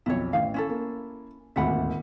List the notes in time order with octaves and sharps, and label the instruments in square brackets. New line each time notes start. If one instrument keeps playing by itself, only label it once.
[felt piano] B1 F2 [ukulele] E4 C#5
[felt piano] A1 [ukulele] F5
[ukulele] C#4 E4 A4
[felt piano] A#3
[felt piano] D#1 G#1 D2 [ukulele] E5 F#5 B5